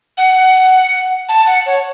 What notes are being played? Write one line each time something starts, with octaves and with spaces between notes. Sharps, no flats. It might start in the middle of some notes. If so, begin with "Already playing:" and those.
F#5
A5
F#5
C#5